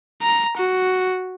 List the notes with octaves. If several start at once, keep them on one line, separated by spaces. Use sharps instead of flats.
A#5
F#4